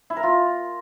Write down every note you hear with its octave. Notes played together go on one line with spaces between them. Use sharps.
E4
A#4
F4